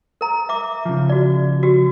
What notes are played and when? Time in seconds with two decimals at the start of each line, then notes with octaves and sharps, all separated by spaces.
0.21 A#4 A#5
0.49 E5 D6
0.85 C#3 F3
1.10 F#4 D5
1.63 F#4 G4